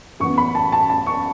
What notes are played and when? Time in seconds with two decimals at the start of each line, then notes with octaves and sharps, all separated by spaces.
0.20 F#2 E3 B3 C#6
0.38 B5
0.55 A5
0.72 A5
0.89 A5
1.06 C#6